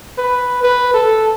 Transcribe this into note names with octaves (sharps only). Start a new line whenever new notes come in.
B4
B4
A4